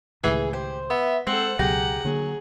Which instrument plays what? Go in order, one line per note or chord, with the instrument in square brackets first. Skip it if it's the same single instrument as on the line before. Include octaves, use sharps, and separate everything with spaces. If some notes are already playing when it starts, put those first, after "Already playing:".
[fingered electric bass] C#2 A2 D#3 [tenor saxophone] E3 [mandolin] G#4
[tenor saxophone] G4 [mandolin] C5
[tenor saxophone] B3 [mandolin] E5
[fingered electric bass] G#3 [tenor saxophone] C4 [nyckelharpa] A4 F#5 [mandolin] C5
[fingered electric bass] C#2 B2 F#3 [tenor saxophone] G4 [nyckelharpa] G#4 F#5 [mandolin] A#5
[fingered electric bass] D3 A#3 [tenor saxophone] F#3 [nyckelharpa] G#4